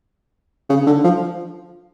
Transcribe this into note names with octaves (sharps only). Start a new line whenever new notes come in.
C#3
D3
F3